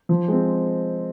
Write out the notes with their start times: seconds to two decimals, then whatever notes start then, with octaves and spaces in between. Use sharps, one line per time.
0.09 F3
0.28 G#3 C4